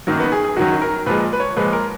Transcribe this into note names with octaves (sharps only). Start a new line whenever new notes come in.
F#2 D#3 F#3 A#3
B3
G#4
G#4
F#2 D#3 F#3 F#4
A#4
A#2 F3 G#3 B4
B4
C#5
A#2 F3 G#3 B4
A#4